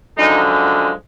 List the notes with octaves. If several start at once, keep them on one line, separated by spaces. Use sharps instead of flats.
F#2 D3 F3 G#3 D#4